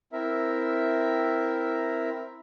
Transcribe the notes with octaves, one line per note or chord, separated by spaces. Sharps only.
C4 E4 A#4 E5